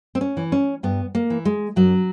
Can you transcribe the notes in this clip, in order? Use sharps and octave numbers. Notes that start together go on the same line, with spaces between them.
C4
C#4
E3
C#4
G2 B3
A#3
E3
G#3
F#2 F#3